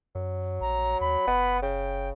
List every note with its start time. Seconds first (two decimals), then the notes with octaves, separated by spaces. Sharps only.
0.15 F#2 F#3
0.61 A#1 A#5
1.01 D#2 B5
1.27 F#1 B3
1.62 C#3 G5